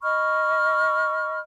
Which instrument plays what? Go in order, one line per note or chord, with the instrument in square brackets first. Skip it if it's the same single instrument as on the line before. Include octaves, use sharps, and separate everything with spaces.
[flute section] D#5 B5 C#6 F6